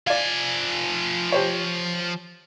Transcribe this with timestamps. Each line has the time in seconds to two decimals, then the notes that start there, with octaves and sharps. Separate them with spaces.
0.07 F3 D5 F5 G#5
1.32 G4 C5 C#5